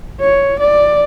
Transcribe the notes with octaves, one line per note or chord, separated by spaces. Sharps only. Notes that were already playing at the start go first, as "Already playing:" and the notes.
C#5
D5